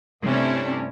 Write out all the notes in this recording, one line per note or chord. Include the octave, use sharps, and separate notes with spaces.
G2 C3 A3 C#4 D4 E4